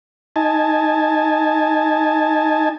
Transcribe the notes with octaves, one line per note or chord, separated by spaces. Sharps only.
D#4 G#5 A5